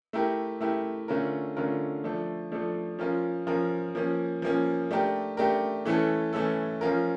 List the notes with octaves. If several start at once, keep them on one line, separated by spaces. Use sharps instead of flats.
A3 E4 G4 A#4
A3 E4 G4 A#4
D3 A3 C#4 F4 A#4
D3 A3 C#4 F4 A#4
F3 A3 D4 A4
F3 A3 D4 A4
F3 C#4 F4 A#4
F3 C#4 F4 A#4
F3 A#3 C#4
F3 A#3 C#4
A3 D4 G4 A#4
A3 D4 G4 A#4
E3 A3 C#4 E4 A4
E3 A3 C#4 E4 A4
F3 C#4 F4 A#4